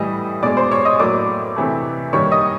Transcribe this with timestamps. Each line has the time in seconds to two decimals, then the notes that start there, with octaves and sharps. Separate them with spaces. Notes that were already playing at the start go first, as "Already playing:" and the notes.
Already playing: A2 E3 G3 D#5 D#6
0.43 B2 G#3 D5 D6
0.57 C5 C6
0.71 C#5 C#6
0.85 D#5 D#6
0.99 A2 F#3 A#3 D5 D6
1.56 C3 E3 A3
2.13 D#3 G3 A#3 C#5 C#6
2.32 D#5 D#6